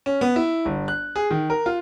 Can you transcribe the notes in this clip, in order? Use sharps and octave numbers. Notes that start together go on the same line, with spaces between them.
C#4
B3
E4
G1
F#6
G#4
D#3
A#4
F4